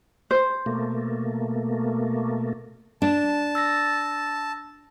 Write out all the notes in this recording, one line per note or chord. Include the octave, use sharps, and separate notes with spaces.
C5
B2 A3 A#3
D4 A5
E6 A6 A#6